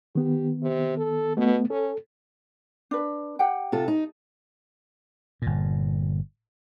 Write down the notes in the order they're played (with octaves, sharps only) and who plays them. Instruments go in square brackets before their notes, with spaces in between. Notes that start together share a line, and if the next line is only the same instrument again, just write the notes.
[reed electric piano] D#3 B3 [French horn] G4
[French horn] C3
A4
[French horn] B2 [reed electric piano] A3 B3
[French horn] C#4 [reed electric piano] A4
[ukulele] D4 B4
G4 F#5 G5
[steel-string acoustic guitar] C3 F4 A4
D#4
[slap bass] G1 A#2